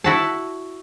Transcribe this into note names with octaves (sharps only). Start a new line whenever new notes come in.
E4 F#4 A5